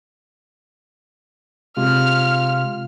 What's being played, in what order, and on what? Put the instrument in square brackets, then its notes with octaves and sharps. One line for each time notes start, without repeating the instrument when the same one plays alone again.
[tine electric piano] C3 G#3 [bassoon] F4 [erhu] F6